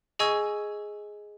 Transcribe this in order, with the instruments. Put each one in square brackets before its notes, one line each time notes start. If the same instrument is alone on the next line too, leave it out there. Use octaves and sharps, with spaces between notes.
[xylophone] G#4 D#5 G#5 C#6 E6 G#6